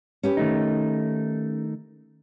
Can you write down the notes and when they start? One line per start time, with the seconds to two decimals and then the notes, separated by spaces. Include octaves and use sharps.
0.23 C#4 G4 B4
0.37 D#3 A3 D#4